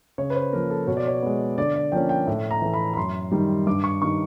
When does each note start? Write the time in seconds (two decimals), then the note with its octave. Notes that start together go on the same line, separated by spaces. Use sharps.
0.18 C#3 C#5
0.30 B4
0.36 C5
0.53 F3 A#3 A#4
0.70 A4
0.87 B2 C#5
0.97 D5
1.07 C#5
1.22 G#3 B3
1.58 D3 D5
1.75 D5
1.92 F3 A#3 C#4 G5
2.09 G5
2.27 A2
2.51 A#5
2.62 E3 A3
2.74 B5
2.93 B5
2.97 F#2 C6
3.32 D#3 G3
3.67 G2 D6
3.84 C#6
4.02 D#3 G3 C#6